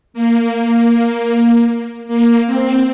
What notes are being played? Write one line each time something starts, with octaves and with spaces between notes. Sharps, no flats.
A#3
A#3
C4